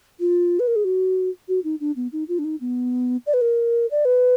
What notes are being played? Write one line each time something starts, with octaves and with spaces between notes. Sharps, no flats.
F4
B4
A#4
G#4
F#4
F#4
D#4
D4
B3
D#4
F4
D4
D#4
B3
D5
B4
A#4
D5
B4